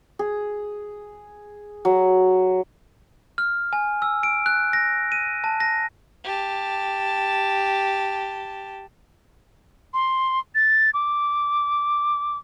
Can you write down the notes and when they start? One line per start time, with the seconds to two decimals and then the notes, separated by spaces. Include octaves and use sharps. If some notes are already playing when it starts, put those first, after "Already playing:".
0.19 G#4
1.85 F#3
3.38 F6
3.73 G#5
4.02 E6
4.23 D7
4.46 F#6
4.73 A#6
5.12 D#7
5.44 A5
5.60 A#6
6.24 G4 A5
9.94 C6
10.55 A6
10.94 D6